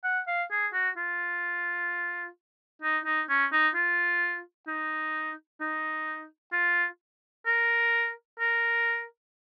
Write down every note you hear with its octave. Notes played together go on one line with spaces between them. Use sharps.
F#5
F5
G#4
F#4
F4
D#4
D#4
C#4
D#4
F4
D#4
D#4
F4
A#4
A#4